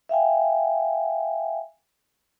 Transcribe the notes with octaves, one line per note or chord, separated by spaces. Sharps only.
E5 F5 G5 G#5